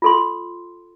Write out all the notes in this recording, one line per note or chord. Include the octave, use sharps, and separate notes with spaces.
F4 A4 C6